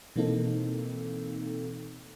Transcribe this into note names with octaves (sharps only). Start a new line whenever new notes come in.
B2 E3 A#3 C4 D#4 A4